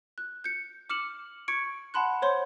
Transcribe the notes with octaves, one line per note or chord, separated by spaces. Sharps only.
F#6
G6 C#7
D6 F6 C#7 E7 F#7
C#6 G#6 C#7 D7
F#5 A5 B5 C6 F#6
C5 C#5 C6 G6